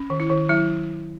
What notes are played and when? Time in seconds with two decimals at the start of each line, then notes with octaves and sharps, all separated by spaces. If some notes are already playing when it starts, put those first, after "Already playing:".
Already playing: C#4
0.10 D#3
0.20 E4
0.30 D#3
0.49 F#3 E4